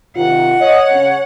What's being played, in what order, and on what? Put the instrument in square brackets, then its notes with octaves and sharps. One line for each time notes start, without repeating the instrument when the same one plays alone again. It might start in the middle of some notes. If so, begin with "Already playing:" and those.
[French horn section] C3 D#3 [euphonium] F4 [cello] F#5
[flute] C#5 [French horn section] D#5
[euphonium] C#3 [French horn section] C#4